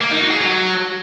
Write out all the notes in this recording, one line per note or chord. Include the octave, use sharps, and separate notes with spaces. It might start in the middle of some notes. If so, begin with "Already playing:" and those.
A#3
D#4
F#4
G#4
F#3